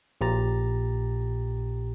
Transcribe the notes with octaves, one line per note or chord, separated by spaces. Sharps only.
A#1 A#2 G4 A#5 A6